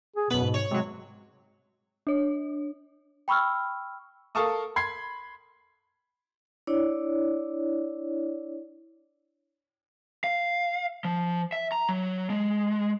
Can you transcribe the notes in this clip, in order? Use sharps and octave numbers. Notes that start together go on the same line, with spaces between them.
G#4
F#2 B2 B3 B4 B5
G#2
C#5
C3 F#3 G#3
D4 C#5
G5 B5 C#6 E6 F6
A4 A#4 F5 A5 C#6 D#6
B5 C6 G#6 C7
D4 E4 C#5 D5
F5
F3
E5
A#5
F#3
G#3